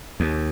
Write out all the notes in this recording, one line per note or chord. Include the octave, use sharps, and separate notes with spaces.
D#2